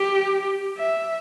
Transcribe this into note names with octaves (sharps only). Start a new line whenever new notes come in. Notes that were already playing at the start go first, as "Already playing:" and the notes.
Already playing: G4
E5